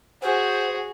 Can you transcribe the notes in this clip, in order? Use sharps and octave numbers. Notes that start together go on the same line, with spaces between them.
F#4 G#4 C5